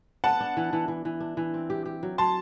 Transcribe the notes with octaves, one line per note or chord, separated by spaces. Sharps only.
B3 F#5 A5
D4
E3
E3
E3
E3
D4
E3
C4
G4
G4
F#3
F#3 A5 C6